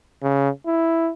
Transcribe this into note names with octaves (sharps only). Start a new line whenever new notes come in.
C#3
E4